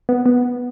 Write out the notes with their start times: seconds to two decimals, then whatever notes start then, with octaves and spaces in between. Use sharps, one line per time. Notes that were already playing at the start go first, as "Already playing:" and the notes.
0.09 B3
0.26 B3